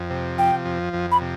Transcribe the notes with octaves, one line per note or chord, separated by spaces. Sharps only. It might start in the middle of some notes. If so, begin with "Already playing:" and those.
Already playing: F2
C3
F3 G5
F2
F2
B5
C3